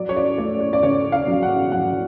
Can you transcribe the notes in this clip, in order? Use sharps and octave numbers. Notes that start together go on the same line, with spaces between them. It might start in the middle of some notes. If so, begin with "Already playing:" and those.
Already playing: F#3 D5
C#5
D5
A3 D5
C#5
D5
C#3 C#5
F5
F#3
F#5
F#3 F#5